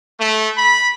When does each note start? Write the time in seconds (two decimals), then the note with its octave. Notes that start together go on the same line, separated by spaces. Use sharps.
0.19 A3
0.56 B5